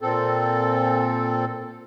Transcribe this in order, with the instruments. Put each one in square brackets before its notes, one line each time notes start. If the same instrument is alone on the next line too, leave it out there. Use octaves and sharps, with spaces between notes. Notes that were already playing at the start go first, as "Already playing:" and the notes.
[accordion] A#2 C4 A4